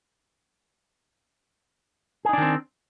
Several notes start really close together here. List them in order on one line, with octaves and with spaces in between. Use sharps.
G#4 D#4 D4 D#3 C4